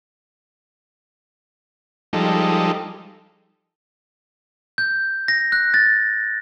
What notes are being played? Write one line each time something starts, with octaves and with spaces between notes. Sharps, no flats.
F3 G3 G#3 D#4 A4
G6
A#6
F#6
A6